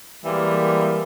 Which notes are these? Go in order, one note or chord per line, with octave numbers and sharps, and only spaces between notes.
E3 G3 G#3 A#3